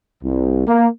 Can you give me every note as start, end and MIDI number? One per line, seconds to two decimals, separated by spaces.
0.24 0.63 36
0.67 0.87 58